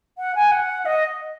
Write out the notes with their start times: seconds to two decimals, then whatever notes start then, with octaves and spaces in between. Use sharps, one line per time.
0.18 F#5
0.35 G#5
0.51 F#5
0.86 D#5